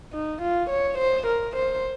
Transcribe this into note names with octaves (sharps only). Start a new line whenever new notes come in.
D#4
F4
C#5
C5
A#4
C5